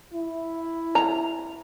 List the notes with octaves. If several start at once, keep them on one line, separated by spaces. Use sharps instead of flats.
E4
A#5